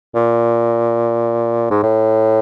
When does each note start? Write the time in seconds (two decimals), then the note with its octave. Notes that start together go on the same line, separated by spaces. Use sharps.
0.15 A#2
1.71 G#2
1.83 A2